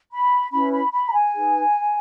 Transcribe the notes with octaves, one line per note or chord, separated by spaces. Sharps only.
B5
C#4 E4 B4 B5
B5
B5
A#5
G#5
D#4 G#4 B4